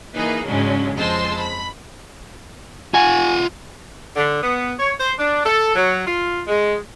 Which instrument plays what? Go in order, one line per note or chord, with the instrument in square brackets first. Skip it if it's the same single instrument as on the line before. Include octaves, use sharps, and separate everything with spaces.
[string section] E3 A#3 D#4 G#4 B4
G#2 C#3 F#3 G#3 C#4 D4
F2 G#3 C5 A5 C6 E6
B5
[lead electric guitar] F4 F#5 [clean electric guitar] G#5
[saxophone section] D3
B3
C#5
C5
D4
A4
F#3
F4
G#3